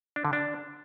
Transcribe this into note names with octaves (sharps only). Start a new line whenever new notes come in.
D4
D3
D4